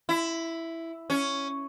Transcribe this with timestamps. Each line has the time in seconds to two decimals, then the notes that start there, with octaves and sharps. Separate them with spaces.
0.09 E4
1.10 C#4